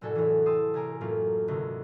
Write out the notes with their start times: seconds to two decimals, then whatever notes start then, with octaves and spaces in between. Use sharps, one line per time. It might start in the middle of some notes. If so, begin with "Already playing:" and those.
0.01 F#1 C2 A2 F#4 A4 G#5
0.15 E2 A2 E3
0.46 G5 A5 C6 D#6 E6
0.74 C2 G#5 A#5 D7
1.01 F#2 A2 A3 A#3 C4 F4
1.48 G#1 D2 C3